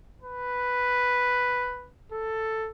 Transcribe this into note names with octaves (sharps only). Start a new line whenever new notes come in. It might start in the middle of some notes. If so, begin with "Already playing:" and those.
B4
A4